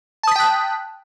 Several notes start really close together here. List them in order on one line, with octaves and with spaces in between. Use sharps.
A5 D#6 B6 G5 F#6